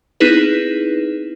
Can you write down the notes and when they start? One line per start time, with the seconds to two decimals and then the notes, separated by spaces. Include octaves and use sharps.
0.20 B3 C4 D#4 E4 G#4 B4